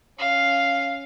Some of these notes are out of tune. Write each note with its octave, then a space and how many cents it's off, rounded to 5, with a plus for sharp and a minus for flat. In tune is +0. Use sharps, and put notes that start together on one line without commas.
C#4 +0 F5 +0